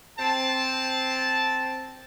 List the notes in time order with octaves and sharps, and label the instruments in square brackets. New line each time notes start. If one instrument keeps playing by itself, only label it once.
[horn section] C4 A5